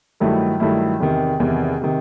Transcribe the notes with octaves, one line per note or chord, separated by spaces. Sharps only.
G2 D#3 F#3 A3 E4
G2 D#3 F#3 A3 E4
E2 C3 D#3
E2 C3 D#3
C3 D#3